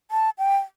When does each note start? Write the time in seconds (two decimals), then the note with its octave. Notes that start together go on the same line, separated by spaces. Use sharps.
0.11 A5
0.38 G5